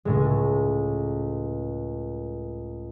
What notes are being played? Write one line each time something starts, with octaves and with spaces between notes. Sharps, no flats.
C#2 A2 G#3